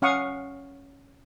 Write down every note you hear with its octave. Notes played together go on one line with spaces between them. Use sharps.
C#4 F5 F#5 C#6 D#6